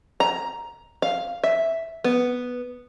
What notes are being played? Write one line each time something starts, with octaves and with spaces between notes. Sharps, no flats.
A#5
F5
E5
B3